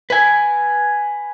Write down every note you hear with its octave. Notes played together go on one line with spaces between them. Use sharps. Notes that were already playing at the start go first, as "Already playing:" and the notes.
B4 G#5